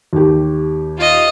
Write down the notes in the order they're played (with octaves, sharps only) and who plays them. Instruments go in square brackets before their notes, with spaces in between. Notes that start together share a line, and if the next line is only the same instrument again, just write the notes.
[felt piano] D#2 G4
[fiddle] F4 D#5